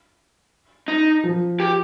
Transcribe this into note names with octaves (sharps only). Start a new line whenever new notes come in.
D#4
F3
G4